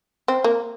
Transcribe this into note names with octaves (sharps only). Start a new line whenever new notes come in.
C4
A#3